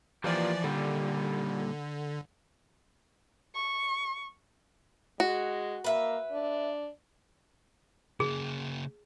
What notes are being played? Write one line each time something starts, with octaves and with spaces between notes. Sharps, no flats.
E3 F3 A#3 F4 G4 D5
A#2 D3 G3
C#6
G#3 F#4
A#3 B4 E5
D4
C#3 A#3 G#4